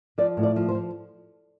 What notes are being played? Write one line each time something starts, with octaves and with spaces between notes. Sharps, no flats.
F3 D5
A2
D5
F3
C5
F3